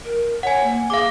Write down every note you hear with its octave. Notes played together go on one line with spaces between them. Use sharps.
A#4
C#5 F#5 G#5
A#3
G#4 F5 D6